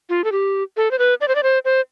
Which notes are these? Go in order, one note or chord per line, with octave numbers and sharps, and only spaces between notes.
F4
A4
G4
A4
C5
B4
D5
C5
D5
C5
C5